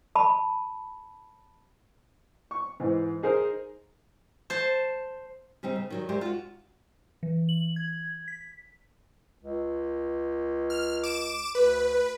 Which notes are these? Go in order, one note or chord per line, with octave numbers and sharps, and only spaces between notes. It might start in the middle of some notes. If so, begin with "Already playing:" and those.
A5 B5
C#6
G#2 E3
D#4 G#4 A#4 C5
C5 A5
C#3 G3 C4 D#4
C#3
D#3 F#3 G3
G#3 G4 A#4 C5 D5 E5
F4 F#4
E3
F#7
G#6
B6
C#2
F6
D6 D7 E7
D2 B4